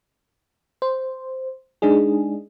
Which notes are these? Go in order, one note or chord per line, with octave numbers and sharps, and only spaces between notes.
C5
G#3 D4 D#4 G#4